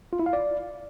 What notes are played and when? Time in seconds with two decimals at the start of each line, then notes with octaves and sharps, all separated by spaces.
0.13 F4
0.19 E4
0.26 F5
0.33 D5